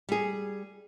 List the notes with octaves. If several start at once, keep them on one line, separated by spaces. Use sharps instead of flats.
G3 G#4